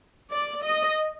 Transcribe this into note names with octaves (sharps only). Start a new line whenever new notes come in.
D5
D#5